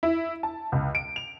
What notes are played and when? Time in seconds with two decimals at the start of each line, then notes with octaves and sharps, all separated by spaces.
0.03 E4
0.43 A5
0.72 C#2
0.95 D7
1.16 F7